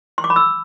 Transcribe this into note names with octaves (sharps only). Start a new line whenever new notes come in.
C6
D6
B5
E6